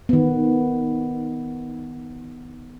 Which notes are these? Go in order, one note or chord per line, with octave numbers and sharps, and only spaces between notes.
D#3 B3